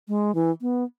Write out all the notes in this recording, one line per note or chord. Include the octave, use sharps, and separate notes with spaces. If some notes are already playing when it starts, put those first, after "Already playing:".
G#3
E3
B3